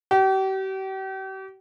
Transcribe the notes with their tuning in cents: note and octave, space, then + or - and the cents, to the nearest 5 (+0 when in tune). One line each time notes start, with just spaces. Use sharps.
G4 -40